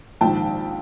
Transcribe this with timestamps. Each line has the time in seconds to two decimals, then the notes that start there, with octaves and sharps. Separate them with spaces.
0.21 A#1 G#2 D#3 G5 A5